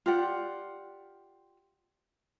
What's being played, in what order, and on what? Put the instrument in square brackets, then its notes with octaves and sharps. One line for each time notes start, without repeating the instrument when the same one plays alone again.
[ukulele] F4 G4 D5 F#5